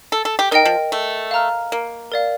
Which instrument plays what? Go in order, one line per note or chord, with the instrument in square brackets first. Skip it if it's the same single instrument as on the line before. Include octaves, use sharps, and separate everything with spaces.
[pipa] A4
A4
G4
[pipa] D#4 [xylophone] A#4 D#5 G5
[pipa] F3
A3
[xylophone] F5 A#5 F6
[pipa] A#3
[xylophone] A#4 D5 F5